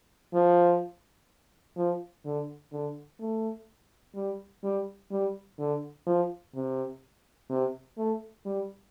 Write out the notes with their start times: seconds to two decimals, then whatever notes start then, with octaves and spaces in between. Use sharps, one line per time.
0.34 F3
1.77 F3
2.25 D3
2.73 D3
3.20 A3
4.16 G3
4.64 G3
5.12 G3
5.59 D3
6.07 F3
6.55 C3
7.50 C3
7.98 A3
8.46 G3